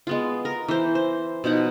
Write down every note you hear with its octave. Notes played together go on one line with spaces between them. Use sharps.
G#3 B3 F4
A#4
E3 C5
C5
B2 F3 D#4 F#5